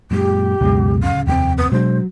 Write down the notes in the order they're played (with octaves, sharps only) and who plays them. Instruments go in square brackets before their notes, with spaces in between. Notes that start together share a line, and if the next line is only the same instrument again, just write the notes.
[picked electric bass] F#2 A#2 G#3 [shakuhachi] G4
[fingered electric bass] C#2 F#2 [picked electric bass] B2 G#3
[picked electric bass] D1 C#3 [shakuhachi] F5
[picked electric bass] F1 [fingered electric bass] D#2 A3 C4 [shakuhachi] G5
[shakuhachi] B3
[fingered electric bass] B2 G#3 D4 [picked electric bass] F#3 [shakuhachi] C5